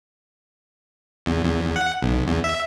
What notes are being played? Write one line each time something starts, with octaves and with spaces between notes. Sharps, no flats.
E2
E2
F#5
B1
E2
E5